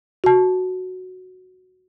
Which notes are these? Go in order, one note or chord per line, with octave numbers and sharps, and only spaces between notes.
F#4 A5